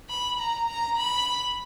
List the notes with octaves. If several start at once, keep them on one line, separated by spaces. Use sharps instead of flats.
B5
A#5
A#5
B5